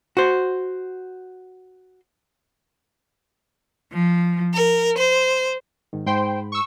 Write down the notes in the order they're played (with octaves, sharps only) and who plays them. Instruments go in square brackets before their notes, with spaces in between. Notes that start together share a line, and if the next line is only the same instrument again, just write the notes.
[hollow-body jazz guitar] F#4 C5
[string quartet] F3
A#4
C5
[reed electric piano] G#2 D#3
[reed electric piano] G#2 B5 [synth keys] C5 G5 C6
[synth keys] C#6 E6